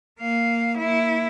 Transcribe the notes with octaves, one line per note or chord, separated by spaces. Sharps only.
A#3 F5
A#3 E4